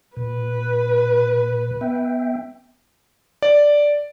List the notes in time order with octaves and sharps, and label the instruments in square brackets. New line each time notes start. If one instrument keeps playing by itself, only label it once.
[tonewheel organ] A#2 [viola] B4
[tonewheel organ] B3 E5 G5
[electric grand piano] D5